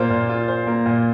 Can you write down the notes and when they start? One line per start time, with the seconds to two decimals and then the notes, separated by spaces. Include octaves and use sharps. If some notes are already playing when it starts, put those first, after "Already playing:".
Already playing: A#2 A#3 F4 C5
0.10 A#2
0.29 F4
0.48 C5
0.67 A#3
0.86 A#2